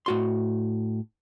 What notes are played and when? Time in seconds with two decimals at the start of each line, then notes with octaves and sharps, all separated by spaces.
0.06 A2 F#4 C6